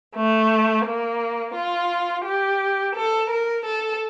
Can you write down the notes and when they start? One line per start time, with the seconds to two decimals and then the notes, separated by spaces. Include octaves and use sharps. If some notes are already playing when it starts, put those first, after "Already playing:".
0.16 A3
0.86 A#3
1.55 F4
2.25 G4
2.95 A4
3.30 A#4
3.65 A4